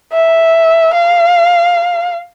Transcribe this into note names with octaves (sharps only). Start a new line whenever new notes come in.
E5
F5